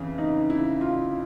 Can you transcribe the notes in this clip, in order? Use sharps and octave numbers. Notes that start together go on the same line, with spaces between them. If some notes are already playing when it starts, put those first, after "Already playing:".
Already playing: F2 C#3 E3
D#4
E4
F4